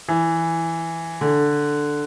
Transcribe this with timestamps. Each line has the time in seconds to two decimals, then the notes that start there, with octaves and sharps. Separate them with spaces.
0.09 E3
1.21 D3